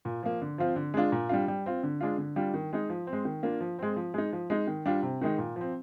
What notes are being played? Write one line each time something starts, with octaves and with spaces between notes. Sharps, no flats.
A#2
F3 A#3
D3
F3 C4 F4
D3
G#3 D4 F4
A#2
G3 D4 F4
G3
C4 F4
D3
G#3 D4 F4
D3
G3 D4 F4
D#3
G#3 D#4
F3
C4
G#3
D#3
A#3 D4 F4
F3
G#3 C4
F3
G#3 D#4
F3
G#3 D#4
D#3
G3 D4 F4
C3
D#3 G#3 D#4
A#2
F3 C4